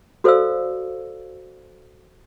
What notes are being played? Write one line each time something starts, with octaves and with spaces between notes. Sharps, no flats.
F#4 A4 C5 D5 F5 E6